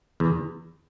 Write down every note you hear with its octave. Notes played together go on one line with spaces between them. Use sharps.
E2